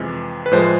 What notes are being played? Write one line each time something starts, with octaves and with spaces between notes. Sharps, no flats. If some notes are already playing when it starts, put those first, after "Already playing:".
Already playing: F2 C3 E3 G#3
B4
A2 F3 G#3 C5